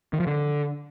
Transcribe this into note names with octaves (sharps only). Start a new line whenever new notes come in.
D#3
F3
D3